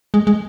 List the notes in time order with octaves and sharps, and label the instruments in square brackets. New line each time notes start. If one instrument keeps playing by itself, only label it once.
[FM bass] G#3
G#3